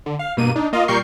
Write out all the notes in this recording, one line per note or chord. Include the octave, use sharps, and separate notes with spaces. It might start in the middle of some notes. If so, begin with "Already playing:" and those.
D3
F5
G2 B2 A#3 D#7
D4 D#4
A#3 F4 D#5 F5
A#2 G3 A#4 C#6 G6 C7